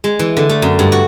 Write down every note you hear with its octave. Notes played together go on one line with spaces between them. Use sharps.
G#3
E3
D3
A3
F#2
G2
F#4